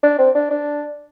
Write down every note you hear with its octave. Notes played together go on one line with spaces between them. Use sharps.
D4
C4
D4
D4